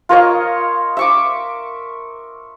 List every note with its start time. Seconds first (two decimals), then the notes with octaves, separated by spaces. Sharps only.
0.09 F4 A#4 C#5 D#5
0.97 E5 C#6 D6